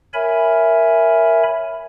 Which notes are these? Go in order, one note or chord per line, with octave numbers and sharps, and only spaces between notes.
A#4 C#5 E5 G#5 B5